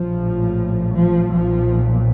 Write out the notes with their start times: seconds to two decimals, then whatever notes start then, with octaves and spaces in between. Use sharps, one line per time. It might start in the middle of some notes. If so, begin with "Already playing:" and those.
Already playing: A#1 A2 F3
0.95 F3
1.31 B1 A#2 F3